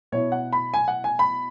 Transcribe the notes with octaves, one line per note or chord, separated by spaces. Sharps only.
B2 B3 E4 C#5
F#5
B5
G#5
F#5
G#5
B5